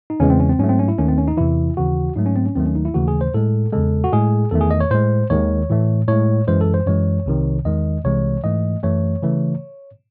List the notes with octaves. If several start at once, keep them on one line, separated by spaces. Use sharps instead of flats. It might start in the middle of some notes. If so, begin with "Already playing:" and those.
D#4
E2 C#3 E3 G#3 C#4
C4
C#4
C4
G#2 F#3 A3 C#4
C4
C#4
E4
D#2 D#3 A3 C#4
C4
C#4
D#4
E2 C3 E3 E4
D#2 C#3 E3 F#4
G#2 F#3 A3 D#4
C#4
C4
C#4
D#2 D#3 F#3 A3 C4
C#4
D#4
E4
D#2 C#3 E3 A3 F#4
G#4
C5
A2 G#3 A4
E2 C#3 G#3 A4
F#4
A2 G#3 G#4
E2 D#3 A3 A4
G#4
D#5
C#5
A2 G#3 C5
D#2 D#3 G#3 C#5
A2 E3 A3
A2 G#3 C#5
F#2 E3 G#3 C5
A4
C5
F#2 E3 G#3 C#5
C2 C3 D#3
E2 D#3 G#3 D#5
C2 C3 E3 G#3 C#5
G#2 E3 A3 D#5
F#2 E3 A3 C#5
C#3 E3 A3